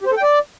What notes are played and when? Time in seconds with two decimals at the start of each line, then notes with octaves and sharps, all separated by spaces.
0.01 G4
0.06 C5
0.12 A4
0.17 G5
0.22 D5